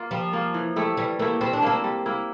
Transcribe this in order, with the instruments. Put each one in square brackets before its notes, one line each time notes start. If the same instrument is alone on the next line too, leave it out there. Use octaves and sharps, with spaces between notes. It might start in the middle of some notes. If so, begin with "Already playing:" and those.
Already playing: [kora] A#3 F4
[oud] F3 [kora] G3
[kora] A#3 F4
E3
A3 E4 G4
[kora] E3 [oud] G3
[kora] A3 E4 G4 [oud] A#3
[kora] G3 [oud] C4
[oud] D4
[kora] A#3 E4 [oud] C4
[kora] G3
A#3 E4